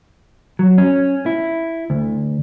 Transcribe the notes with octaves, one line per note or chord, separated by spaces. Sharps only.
F#3
C#4
E4
D2